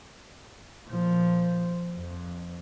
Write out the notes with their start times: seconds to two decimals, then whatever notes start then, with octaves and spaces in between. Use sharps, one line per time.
0.89 A#2 F3
1.95 F2